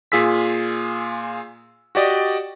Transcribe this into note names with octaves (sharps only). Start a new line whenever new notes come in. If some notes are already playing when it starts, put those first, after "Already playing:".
A#2 F4 G#4 E6 B6
F#4 G4 D5 D#5